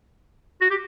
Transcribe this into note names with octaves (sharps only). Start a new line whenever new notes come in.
F#4
G4